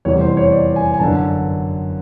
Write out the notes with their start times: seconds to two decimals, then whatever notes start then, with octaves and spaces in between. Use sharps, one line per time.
0.05 F1 E2 C3 E3 G3 C#5
0.21 C5
0.37 C#5
0.52 D5
0.76 G#5
0.94 G#5
0.99 G1 F#2 D3 A5